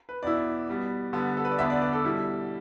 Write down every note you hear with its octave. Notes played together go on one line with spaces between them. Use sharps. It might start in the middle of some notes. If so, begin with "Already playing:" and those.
B4
E2 B2 B3 E4 D5
B2 G3 B3
D3 G3 B3
A4
B4
D5
E2 D3 B3 D4 E5
D5
B4
D5
A4
B2 G3 E4